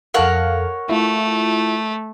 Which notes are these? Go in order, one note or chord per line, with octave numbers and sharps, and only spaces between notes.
F2 A4 A#4 C#5 F5 F#5
A3 E4 F4